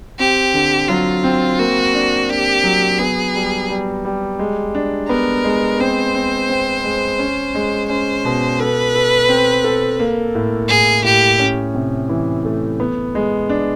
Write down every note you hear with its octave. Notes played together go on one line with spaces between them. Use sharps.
C4 G4
D3
F#3 F4
C4
A#3 F#4
D4
D4 G4
F#3
B3 G#4
G3
G3
G3
G#3
D4
B3 A#4
G#3
C4 C5
C4
C4
G#3
C#4
G#3
C#4 C5
B2
A4 B4
A4
C4
A4
A#3
A2
A2 G#4
A2 G4
C#4
C3
E3
A3
B3
G#3
D4